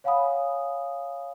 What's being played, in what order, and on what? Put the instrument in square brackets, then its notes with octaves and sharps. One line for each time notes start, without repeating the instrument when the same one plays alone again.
[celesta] C#5 F5 F#5 G#5 B5 D#6